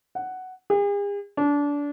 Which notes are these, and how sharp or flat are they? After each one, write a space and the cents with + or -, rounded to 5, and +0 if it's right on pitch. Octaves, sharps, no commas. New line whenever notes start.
F#5 +5
G#4 -45
D4 -25